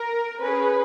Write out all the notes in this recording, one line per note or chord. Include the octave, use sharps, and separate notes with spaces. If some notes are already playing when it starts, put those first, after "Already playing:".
Already playing: A#4
C#4 G#4 B4